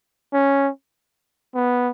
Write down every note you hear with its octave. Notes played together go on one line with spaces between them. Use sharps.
C#4
B3